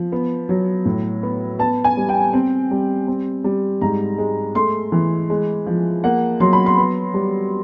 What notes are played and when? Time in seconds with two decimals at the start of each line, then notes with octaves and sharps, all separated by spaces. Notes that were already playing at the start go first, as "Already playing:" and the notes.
Already playing: F3
0.12 B3
0.49 F#3
0.85 A2
1.23 B3
1.59 B3 A5
1.84 G#5
1.97 G3
2.09 G5
2.33 C4
2.71 G3
3.07 C4
3.44 G3
3.81 G#2 A#5
4.18 G#3
4.55 A3 C6
4.92 E3
5.30 G#3
5.67 F3
6.04 A#3 F#5
6.40 F#3 C6
6.53 B5
6.66 C6
6.78 B3
7.14 G3